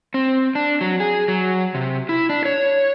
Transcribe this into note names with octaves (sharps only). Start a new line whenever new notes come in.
C4
D4
F#3
G#4
F#3
C3
E4
D4
C#5